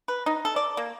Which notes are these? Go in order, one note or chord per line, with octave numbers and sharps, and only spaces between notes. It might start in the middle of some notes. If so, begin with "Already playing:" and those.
B4
D#4
A4
D5
A#3